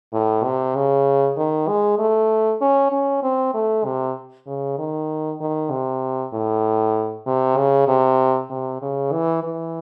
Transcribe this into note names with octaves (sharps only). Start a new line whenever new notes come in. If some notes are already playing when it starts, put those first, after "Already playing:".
A2
C3
C#3
D#3
G#3
A3
C#4
C#4
C4
A3
C3
C#3
D#3
D#3
C3
A2
C3
C#3
C3
C3
C#3
E3
E3